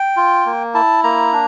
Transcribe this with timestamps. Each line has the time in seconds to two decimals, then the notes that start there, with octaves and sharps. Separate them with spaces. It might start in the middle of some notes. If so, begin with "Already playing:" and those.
Already playing: G5
0.17 F4
0.46 A#3
0.74 E4 A5
1.04 A#3 A#5
1.32 D4